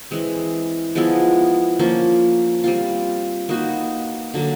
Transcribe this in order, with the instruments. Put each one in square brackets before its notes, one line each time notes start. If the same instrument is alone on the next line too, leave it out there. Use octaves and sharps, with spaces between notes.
[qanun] E3 G#3 C4
F3 G#3 B3 E4
F3 A#3 C#4
G3 C4 F4
A#3 D#4 F#4 B4
D3 F#3 A#3